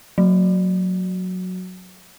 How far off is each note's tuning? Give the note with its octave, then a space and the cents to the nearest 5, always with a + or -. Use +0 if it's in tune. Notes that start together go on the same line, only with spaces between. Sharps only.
F#3 -10 F#4 +0